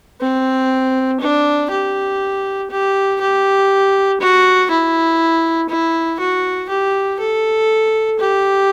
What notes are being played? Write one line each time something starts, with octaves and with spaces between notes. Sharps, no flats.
C4
D4
G4
G4
G4
F#4
E4
E4
F#4
G4
A4
G4